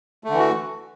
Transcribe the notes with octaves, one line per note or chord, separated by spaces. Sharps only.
D3 E3 A3 F#4